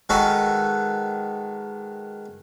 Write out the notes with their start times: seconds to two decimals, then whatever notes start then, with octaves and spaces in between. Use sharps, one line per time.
0.09 D#3 G#3 F#4 A4 B4